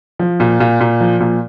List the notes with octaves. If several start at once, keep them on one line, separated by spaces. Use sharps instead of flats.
F3
A#2
A#2
A#2
F3
A#2